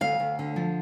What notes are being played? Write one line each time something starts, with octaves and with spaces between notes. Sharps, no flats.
D2 F5
D2
D3
F3